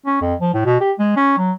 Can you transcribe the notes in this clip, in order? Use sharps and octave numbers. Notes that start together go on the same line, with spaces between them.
C#4
F2
F3
A2
B2
G4
G#3
C#4
F#3